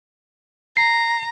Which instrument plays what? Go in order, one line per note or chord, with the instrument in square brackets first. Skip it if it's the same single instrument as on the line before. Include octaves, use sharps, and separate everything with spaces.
[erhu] A#5 [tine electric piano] C7